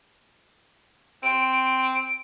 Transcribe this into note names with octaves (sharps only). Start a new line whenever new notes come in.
C4 D7